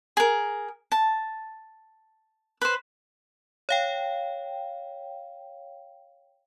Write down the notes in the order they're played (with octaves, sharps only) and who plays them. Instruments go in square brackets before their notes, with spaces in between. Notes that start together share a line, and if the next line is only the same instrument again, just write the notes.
[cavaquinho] G#4 A#4
A5
B4 C5
[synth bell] C#5 F5 G5